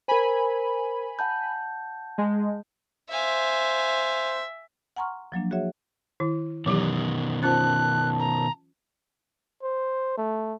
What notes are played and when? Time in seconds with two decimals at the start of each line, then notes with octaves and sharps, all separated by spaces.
0.08 A#4 C5 G#5 B5
1.19 F#5 A5 G6
2.18 G#3
3.11 C5 E5 F5 G#5
4.96 F#5 G#5 A#5 C6 C#6 F6
5.32 F3 F#3 A#3 D4
5.51 F#4 G#4 C#5 E5 F#5
6.20 D#3 E4
6.66 B2 D#3 E3 F#3 G4
7.43 C#4 F4 C5 A5 F#6
8.19 A#5
9.63 C5
10.17 A3